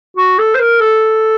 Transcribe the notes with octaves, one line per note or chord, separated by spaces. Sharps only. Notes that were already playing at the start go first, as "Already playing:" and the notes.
F#4
A4
C5
A#4
A4